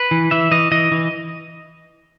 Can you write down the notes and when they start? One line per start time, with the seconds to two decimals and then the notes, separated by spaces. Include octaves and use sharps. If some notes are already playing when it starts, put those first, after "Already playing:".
Already playing: B4
0.11 E3
0.31 E3 E5
0.51 E3 D#5
0.72 E3 D#5
0.92 E3